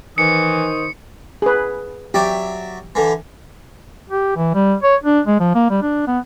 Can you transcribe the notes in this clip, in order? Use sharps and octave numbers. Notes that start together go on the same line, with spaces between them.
D#3 E3 C5 C#6 D#6 C#7
G#4 B4
F#3 G4 D5 E5
D3 E3
G4
E3
G3
C#5
D4
G#3
F3
A#3
G3
D4
B3